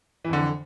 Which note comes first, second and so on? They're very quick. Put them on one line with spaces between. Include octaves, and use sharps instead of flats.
E3 F2 D3